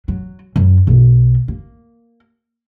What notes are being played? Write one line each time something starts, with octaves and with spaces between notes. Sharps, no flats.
F#3
F#2
B1 A#3
A#3